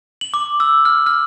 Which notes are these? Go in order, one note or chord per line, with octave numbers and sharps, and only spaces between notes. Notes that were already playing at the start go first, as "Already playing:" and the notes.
F#7
D6
E6
F6
F6